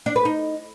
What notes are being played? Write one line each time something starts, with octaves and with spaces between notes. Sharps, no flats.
D4
B4
D#4